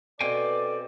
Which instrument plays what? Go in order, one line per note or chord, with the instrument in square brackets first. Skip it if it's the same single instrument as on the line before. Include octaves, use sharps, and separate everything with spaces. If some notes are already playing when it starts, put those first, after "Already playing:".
[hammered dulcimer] B2 C4 [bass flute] A4 [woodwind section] D5 [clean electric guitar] F5 G5 G#5